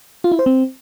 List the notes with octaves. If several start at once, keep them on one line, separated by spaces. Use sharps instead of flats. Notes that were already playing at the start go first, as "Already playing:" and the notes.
F4
E4
C5
C4